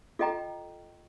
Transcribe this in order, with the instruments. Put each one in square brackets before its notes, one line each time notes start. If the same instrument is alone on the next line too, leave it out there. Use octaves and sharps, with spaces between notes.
[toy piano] F4 A4 D#5 G5 A#5